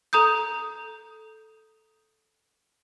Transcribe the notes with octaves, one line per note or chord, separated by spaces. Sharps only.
A4 A#5 D#6 G6